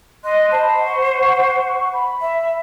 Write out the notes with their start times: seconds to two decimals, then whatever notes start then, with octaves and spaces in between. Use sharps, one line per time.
0.24 D#5 C6 F#6
0.51 C5 D#5 A5 B5
0.80 F#5 C#6
1.93 B5
2.21 E5